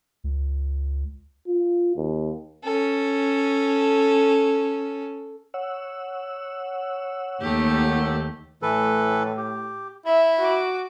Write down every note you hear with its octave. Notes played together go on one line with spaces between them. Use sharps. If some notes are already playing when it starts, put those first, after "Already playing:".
C#2
F4
D#2
C#4 A4
C#5 F#5 E6
D#2 A3 G4
A2 E3 A4 B4
G4
E4 E5
F#4 D6